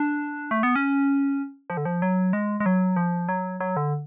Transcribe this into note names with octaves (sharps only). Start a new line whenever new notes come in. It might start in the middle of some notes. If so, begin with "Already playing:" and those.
Already playing: D4
A3
B3
C#4
F3
D3
F3
F#3
G#3
G#3
F#3
F3
F#3
F#3
D3